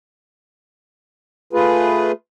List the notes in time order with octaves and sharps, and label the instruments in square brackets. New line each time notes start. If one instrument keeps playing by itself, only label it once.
[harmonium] A3 F4 G#4 B4